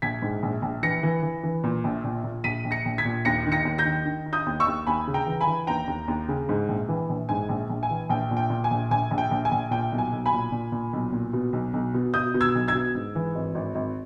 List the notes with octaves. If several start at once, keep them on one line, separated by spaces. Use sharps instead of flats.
A#1 G#6 B6
G#2
A#1
A#1
E3 A#6 C#7
E3
E3
E3
A#2
A#1
A#2
A#2
A#1 B6 D#7
A#1
A#6 C#7
A#1
G#6 B6
A#2
D#2 A#6 C#7
D#3
A#6 C#7
D#2
G6 A#6
D#3
D#3
D#3
D#6 G6
D#2
C#6 E6
D#2
D#2 G#5 B5
C#3
G5 A#5
E3
G#5 B5
E3
D#2 G5 A#5
D#2
D#2
C#3
G#2
A#1
E3
A#1
G#2 G#5
A#1
A#1
G#5
E3
A#1 G5
A#2
G5
A#2
G#5
A#1
A#1 G#5
A#1
G5
A#1
G#5
A#1
A#2 G5
B1
G#5
B1
G#5 B5
A#2
A#2
A#2
B1
A#2
B2
B1
B1
B2
B2 D#6 G6
B2
E6 G#6
B1
E6 G#6
B2
G#2
E3
G#1
G#1
G#1